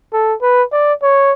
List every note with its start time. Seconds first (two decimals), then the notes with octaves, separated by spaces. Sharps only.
0.13 A4
0.42 B4
0.72 D5
1.02 C#5